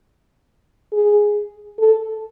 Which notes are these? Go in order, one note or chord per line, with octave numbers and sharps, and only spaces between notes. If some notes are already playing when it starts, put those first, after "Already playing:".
G#4
A4